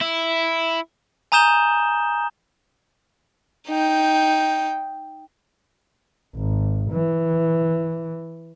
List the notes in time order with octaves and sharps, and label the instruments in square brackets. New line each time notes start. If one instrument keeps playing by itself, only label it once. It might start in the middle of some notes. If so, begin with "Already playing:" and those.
[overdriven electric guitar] E4
[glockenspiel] G#5 A#5 D#6 G6 E7 G7
[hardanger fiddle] D#4 G5
[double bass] G#1
E3